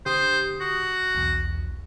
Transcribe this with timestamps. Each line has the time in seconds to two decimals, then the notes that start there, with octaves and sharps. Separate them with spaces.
0.06 D3 G4 C5 D#6
0.60 F#4
1.15 B1 E2